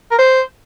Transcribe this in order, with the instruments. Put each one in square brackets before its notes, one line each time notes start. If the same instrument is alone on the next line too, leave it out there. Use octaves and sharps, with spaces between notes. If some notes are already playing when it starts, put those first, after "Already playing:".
[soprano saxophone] A#4
C5